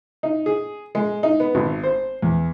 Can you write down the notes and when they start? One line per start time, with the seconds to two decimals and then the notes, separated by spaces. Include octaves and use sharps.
0.23 D#4
0.46 G#4
0.95 G#3
1.23 D#4
1.40 B3
1.55 G#1
1.83 C5
2.22 E2